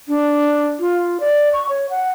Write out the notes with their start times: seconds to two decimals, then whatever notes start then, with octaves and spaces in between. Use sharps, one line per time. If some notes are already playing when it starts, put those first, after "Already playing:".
0.08 D4
0.80 F4
1.20 D5
1.53 C#6
1.69 C#5
1.90 F#5